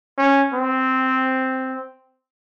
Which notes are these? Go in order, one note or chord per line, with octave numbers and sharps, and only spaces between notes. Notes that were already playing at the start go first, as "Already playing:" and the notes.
C#4
C4